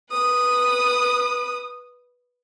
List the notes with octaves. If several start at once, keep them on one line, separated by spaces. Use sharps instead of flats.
B4 D#6